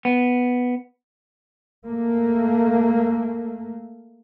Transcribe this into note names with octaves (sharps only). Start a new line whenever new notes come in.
B3
A3 A#3